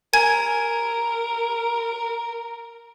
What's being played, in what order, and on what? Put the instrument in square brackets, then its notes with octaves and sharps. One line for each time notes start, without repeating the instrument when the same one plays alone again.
[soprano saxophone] A#4 [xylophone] G#5 G#6